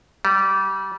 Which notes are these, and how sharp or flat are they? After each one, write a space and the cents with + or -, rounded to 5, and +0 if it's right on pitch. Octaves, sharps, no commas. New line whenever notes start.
G3 -25